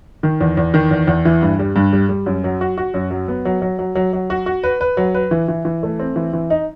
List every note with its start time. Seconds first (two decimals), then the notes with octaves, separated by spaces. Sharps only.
0.23 D#3
0.41 E2
0.57 E2
0.74 D#3
0.91 E2
1.08 E2
1.25 E3
1.42 G2
1.59 G3
1.76 G2
1.93 G3
2.09 G3
2.26 F#2
2.44 F#3
2.61 F#4
2.78 F#4
2.94 F#2
3.11 F#3
3.28 B3
3.45 F#3
3.62 F#3
3.79 F#3
3.95 F#3
4.13 F#3
4.30 F#4
4.46 F#4
4.63 B4
4.81 B4
4.97 F#3
5.15 B4
5.31 E3
5.48 E3
5.65 E3
5.83 A3
5.99 C4
6.16 E3
6.33 E3
6.50 D#4